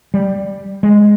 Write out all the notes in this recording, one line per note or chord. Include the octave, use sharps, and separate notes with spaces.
G3
G#3